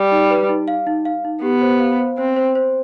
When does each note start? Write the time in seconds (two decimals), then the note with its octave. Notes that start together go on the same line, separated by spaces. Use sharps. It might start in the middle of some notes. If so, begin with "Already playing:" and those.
Already playing: G3
0.12 D#4
0.30 B4
0.49 D#4
0.68 F5
0.87 D#4
1.05 F5
1.25 D#4
1.42 B3 G4
1.61 C5
1.80 F5
1.99 C5
2.18 C4 C5
2.37 C5
2.55 C5